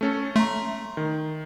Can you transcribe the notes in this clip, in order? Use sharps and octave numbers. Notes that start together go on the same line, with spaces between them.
A3 C#4 A4
A3 A#5 C6
D#3